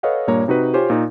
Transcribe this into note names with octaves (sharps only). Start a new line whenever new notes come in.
A4 B4 C#5 D#5 F5 F#5
G2 A#2 A#3 C#5 A#5
C3 D#4 F#4 B4
F4 G4 C5 C#5 G#5
A#2 D#4